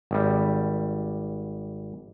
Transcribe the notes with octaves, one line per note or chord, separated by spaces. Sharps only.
G#1 G3